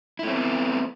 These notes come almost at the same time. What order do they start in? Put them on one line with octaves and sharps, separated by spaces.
E4 A3 C4 B3